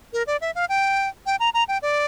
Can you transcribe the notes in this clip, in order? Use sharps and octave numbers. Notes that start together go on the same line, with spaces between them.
A#4
D5
E5
F5
G5
G5
A#5
A#5
G5
D5